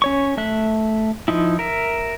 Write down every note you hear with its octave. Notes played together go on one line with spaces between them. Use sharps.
C#4 C#5 C#6
A3 E5 F#6
F3 D#4 E4
A#4 E5